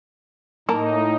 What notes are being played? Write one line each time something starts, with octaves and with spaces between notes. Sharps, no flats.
A2 A#3 D#4 A5 A#5